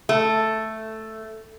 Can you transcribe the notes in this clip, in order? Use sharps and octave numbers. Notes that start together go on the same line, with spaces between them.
A3